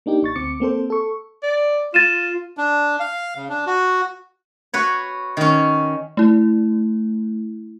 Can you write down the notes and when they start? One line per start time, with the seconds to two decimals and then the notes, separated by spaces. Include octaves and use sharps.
0.06 A#3 D4 D#4 G4
0.23 A1 C#6 A6
0.36 D2 C4 D6 C#7
0.60 A#3 C4 A4 C5
0.90 A4 C#6
1.43 D5
1.94 F4 A6 D#7 E7
2.57 D4
3.00 F5
3.36 C#3
3.49 D4
3.67 F#4
4.74 F#4 B4 C#5
5.37 D#3 C#4
6.17 A3 E4